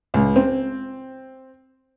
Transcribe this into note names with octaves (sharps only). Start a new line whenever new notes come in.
C#2
C4